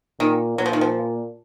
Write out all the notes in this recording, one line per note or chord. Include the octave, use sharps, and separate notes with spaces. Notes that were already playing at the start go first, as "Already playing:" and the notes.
A#2 D#3
A#2 F#3
F3
D#3
F3